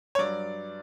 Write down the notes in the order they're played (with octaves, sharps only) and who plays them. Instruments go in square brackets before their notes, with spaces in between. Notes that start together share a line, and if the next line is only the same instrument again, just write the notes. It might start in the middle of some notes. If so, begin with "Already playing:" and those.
[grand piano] C#5
G2 F#3 D5